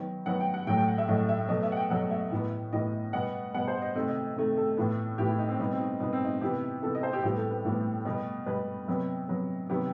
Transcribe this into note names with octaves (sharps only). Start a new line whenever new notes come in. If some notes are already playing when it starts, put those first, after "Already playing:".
Already playing: D#3 F#3 B3
D#3 F#3 B3 F#5
G5
F#5
A2 F#3 A3 G5
G5
F#5
E5
A2 F#3 A3 D#5
E5
B2 F#3 A3 D#5
E5
F#5
G5
B2 F#3 A3 F#5
E5
A2 E3 B3
A2 E3 B3 D#5
B2 G3 B3 F#5
B2 G3 B3 F#5
C5
D#5
C3 D#3 A3 D#5
D#5
C3 D#3 A3
A4
A2 E3 B3
A2 E3 B3 G4
E4
D#4
C4
B2 G3 B3 D#4
C4
D#4
B2 G3 B3 D#4
C4
D#4
C3 E3 B3 G4
C3 E3 B3 A4
D#5
C5
G4
A2 E3 G3 B3 G4
A4
B4
A2 E3 G3 B3
B2 G3 B3
B2 G3 B3 B4
C3 F#3 B3
C3 F#3 B3
C3 D#3 F#3 B3 G4